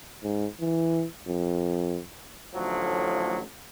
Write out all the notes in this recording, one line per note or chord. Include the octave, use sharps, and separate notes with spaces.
G#2
E3
F2
A1 D2 A2 F3 F#3